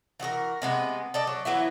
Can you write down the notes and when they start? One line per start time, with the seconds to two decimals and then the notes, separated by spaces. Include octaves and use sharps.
0.20 E3 F#4 G#4 A#4
0.62 C3 G#3 B3
1.14 A4 D5 D#5
1.27 F#3
1.45 E3 F#3 B3 E4